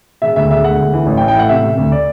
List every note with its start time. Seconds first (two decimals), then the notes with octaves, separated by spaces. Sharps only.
0.22 E1 E5
0.36 D2 E5
0.51 E1 E5
0.64 D2 F#5
0.79 D2
0.93 E3
1.06 A1
1.17 G5
1.21 E3
1.28 G5
1.35 A2 F#5
1.49 C3 E5
1.64 C3
1.78 D2
1.92 D5